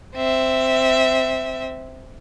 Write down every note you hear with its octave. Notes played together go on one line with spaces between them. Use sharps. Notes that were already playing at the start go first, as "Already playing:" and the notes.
C4 E5